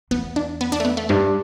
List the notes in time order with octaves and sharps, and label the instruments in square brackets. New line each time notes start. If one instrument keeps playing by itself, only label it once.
[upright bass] E2 [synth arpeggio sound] B3
[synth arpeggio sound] D4
B3
D4
A3
B3
A3
[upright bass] G2 [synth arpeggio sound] G3